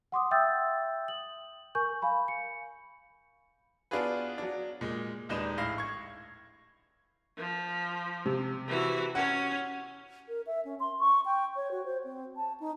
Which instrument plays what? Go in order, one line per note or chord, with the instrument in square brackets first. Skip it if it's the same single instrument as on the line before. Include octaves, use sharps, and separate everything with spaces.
[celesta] F#5 C6 D6 D#6
E5 G5 D#6 E6 G6 A6
F#7
A#4 G#5 C#6 G6
F5 G#5 B5
C#7
[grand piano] B3 D4 F4 F#4 G#4 B4
F#3 D4
A#2 G#3
D#1 G#3 D4 D#4 B4 E7
A#1 A2 F5 A#6
C#6 G#6
[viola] F3
[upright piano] C3
[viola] E3 F#4
[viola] C#4 C#5 [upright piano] F#5
[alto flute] A#4
E5
C#4
C6
C#6
G5
C#5
F#4
C5
C4
A5
D#4